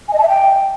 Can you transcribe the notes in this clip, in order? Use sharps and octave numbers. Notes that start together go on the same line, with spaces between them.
G#5
D#5
A5
E5
G5